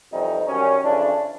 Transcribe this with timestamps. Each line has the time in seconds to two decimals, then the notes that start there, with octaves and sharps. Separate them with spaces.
0.12 F2 C3 E3 G3 D#4
0.47 F#2 D#3 G3 C#4
0.83 F2 C#3 E3 D4